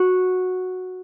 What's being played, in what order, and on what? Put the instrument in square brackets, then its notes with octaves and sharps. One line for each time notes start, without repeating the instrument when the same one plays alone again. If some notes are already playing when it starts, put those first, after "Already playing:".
Already playing: [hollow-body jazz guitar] F#4